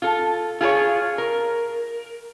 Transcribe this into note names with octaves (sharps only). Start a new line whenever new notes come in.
F4 A4
F4 G#4 A#4 C#5
A#4